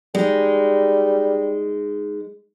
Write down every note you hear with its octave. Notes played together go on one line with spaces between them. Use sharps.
G3 G#3 D#4